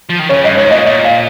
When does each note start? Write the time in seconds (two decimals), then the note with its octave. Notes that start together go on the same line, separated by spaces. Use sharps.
0.10 F3
0.20 D#3
0.29 C#3 C#5
0.44 G2 D#5
0.57 G#2 C#5
0.71 A#2 D#5
0.85 A#2 D#5
1.04 F5